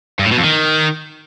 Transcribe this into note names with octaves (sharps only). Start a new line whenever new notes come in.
G2
A2
B2
F2
D#3